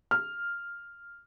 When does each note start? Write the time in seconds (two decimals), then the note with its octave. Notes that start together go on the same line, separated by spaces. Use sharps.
0.11 F6